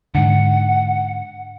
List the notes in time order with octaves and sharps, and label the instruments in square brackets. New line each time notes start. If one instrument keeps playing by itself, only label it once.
[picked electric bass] G#2 D3 [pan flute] F#5